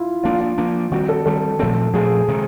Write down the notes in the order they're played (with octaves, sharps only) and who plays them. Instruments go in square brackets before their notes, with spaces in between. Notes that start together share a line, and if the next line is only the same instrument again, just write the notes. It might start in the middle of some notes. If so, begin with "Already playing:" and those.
Already playing: [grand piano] E4 F4
[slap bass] F3 A#3 D4 [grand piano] F4
[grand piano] F4
[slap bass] F3 A#3 D4
[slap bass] D#3 G3 C4 [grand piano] F#4
[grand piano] A4
[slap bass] D#3 G3 C4 [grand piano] A4
[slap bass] A#2 F3 A3 C4 [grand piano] A4
[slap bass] A#2 F3 A3 C4 [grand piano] G#4
[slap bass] C3 D#3 G#3